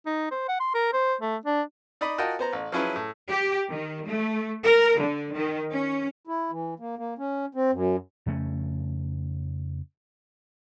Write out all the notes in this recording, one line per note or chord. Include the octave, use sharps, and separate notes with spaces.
D#4
C5
F#5
C6
A#4
C5
A3
D4
D#4 D5 D#5 B5
F4 F#4 A#4 D#5 G5 A5
B3 C5 A#5
A1
F3 F#3 C#4 E4 G#4 B4
A2
G4
D#3
A3
A#4
D3
D#3
C#4
E4
E3
A#3
A#3
C#4
C4
F#2
F2 C#3 A3 C#4